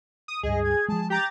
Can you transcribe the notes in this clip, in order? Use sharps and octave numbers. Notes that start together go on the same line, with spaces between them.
D#6
C#2 G2 G#4 D#5
G#6
F3 G#3 A5
G4 A#5 G6 A6